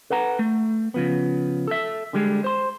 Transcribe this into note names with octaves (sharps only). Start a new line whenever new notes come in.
A4 B4 F#5 A#5
A3
C#3 F3 B3
A4 E5
D3 G3 G#3
C5 C6